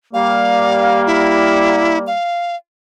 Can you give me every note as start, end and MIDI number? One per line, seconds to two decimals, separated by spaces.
0.14 2.13 55
0.14 2.13 58
0.14 1.02 77
1.07 1.98 64
2.07 2.56 77